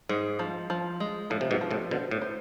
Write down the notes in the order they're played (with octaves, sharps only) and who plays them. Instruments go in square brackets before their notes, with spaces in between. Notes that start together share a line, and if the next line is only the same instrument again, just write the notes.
[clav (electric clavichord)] G#2 [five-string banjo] G#3
[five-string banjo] F3
F3
G#3
[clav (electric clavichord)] A2 [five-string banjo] F3
[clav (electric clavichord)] C3
G#2 B2
[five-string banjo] F3
[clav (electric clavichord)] A2 C3
[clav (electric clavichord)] B2 D3 [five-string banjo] C5
[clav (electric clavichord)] A2
[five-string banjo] C5